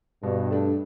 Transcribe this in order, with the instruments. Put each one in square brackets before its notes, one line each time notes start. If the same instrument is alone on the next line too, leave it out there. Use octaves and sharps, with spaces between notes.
[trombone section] G2 [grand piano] B2
[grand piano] A3 D4